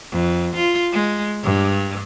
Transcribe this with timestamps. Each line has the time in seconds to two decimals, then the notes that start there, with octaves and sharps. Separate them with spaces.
0.11 F2
0.56 F4
0.93 G#3
1.43 G2